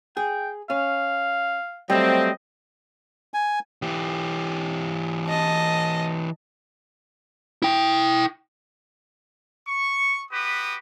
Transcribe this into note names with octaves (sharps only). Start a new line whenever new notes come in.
G#4 G5
C#4 F5
F#3 G3 A3 C4 D#5
G#5
E3 G4
D#5 A5
E4 G5
C#6
F#4 G4 B4 D#6